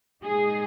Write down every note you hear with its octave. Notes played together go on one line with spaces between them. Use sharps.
A#2 G#3 D#4 G#4